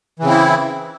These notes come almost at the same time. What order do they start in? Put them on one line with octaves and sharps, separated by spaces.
E3 C#3 C4 E4